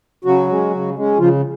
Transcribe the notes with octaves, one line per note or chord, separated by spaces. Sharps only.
C#3 F#3 F#4
G#3 C#4
C#3
G#3 C#4
C#3 F3 F4